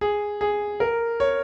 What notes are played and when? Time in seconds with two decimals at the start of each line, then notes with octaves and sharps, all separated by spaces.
0.01 G#4
0.41 G#4
0.80 A#4
1.20 C#5